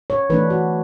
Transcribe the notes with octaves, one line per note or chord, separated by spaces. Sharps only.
C#5
E3 A3 D4 B4
F#4